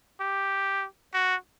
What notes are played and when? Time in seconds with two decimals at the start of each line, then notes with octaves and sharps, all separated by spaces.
0.20 G4
1.14 F#4